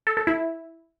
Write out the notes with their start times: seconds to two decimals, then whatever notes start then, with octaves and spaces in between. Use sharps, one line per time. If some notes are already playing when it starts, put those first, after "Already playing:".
0.07 A4
0.17 A4
0.27 E4